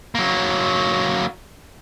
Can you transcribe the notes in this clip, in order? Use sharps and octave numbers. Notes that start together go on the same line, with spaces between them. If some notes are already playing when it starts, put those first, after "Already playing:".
F#3 A#3